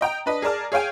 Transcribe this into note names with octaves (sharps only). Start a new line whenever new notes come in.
D#5 G5 A#5
D4 B4 D#5
G#4 A#4 D5 A5 F6
G#4 C#5 F5 G5 G#5